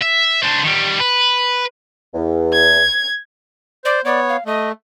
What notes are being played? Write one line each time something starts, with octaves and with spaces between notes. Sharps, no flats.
E5
D4 C5
D#3 G3
B4
E2
G#6
C5 D5
B3 C#5 D5
F5
A3 D#5